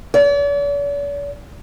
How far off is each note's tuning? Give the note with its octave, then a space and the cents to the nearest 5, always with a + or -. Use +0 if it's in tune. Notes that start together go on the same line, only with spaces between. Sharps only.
D5 -45